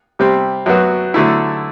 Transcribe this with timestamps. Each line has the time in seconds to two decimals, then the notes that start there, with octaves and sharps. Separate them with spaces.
0.19 C3 G3 C4
0.66 F#2 F#3 B3 F#4
1.14 D3 F#3 A3 E4